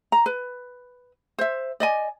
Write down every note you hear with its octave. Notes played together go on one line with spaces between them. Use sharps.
A#5
B4
C5 E5
D5 D#5 G#5